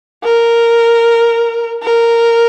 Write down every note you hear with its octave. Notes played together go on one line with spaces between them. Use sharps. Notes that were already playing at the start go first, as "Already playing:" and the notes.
A#4
A#4